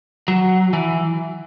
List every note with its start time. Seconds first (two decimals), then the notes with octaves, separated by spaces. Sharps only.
0.28 F#3
0.73 E3